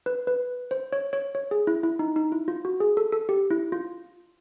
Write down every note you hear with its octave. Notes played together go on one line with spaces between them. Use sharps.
B4
B4
C5
C#5
C#5
C#5
G#4
E4
E4
D#4
D#4
E4
F4
F#4
G#4
A4
A4
G4
E4
F4